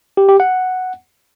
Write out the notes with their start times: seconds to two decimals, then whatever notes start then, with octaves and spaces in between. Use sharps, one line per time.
0.17 G4
0.29 G4
0.40 F#5